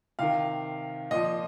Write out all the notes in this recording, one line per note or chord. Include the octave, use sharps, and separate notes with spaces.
C3 D#3 F5
A#2 F3 D#5